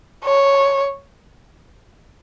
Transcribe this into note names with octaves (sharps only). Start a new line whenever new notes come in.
C#5